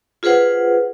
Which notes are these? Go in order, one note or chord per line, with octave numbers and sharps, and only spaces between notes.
F4 G#4 B4 C5 F#5